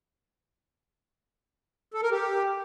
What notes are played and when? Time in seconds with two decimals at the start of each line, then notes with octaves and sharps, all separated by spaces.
1.94 A4
2.03 A#4
2.12 G4